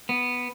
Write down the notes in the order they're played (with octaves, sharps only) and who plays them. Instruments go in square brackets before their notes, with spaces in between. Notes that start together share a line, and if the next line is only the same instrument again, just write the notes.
[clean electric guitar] B3